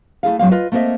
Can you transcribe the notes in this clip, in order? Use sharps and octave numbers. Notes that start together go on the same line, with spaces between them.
A3 E4 G#4 F5
G#2 F#3 C4 F5
F4 B4 D#5
A3 A#3 C4 C5 D#5 E5